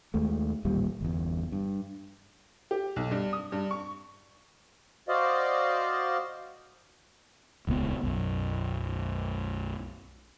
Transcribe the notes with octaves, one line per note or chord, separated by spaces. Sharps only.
D#2 G#3 A3
A1 D#2 A#2 G3
G1 E2
G2
G4
B1
G2
D#6
G2
C#6
F#4 C5 D5 D#5 F5
D#1 C#2 B2 B3
B1 F#2